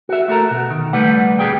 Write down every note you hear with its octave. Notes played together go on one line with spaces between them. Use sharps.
F#4 E5
A3 F#4 A4 A#4
B2
D#3
C#2 G3 A3 G4 B4 F#5
D2 B2 G3 A#3 G#4 G5